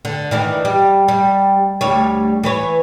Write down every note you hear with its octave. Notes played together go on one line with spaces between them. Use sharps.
D3
D#3 E3 D4
G3
G3
D2 G3 C#5
E3 B4 C#5